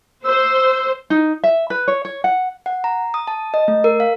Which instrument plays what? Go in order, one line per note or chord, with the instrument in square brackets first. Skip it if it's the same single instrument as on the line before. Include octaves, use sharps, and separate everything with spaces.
[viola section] C5 [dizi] E6
[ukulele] D#4
E5
B4
C#5
C#5
F#5
[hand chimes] F#5
A#5
D#6
A5
D#5
A3
A#4
F5